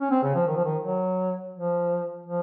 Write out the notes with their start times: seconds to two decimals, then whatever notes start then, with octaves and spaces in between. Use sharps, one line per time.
0.01 C#4
0.11 C4
0.23 C#3
0.35 F3
0.47 D#3
0.56 F3
0.65 D#3
0.83 F#3
1.54 F3
2.26 F3